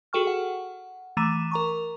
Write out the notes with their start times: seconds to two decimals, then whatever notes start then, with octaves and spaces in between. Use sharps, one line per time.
0.13 F#4 G#4 A4 G5 C#6 F6
0.27 F#5
1.17 E3 A3 A#5 D6 D#7 E7
1.51 A#4 A#5 C#6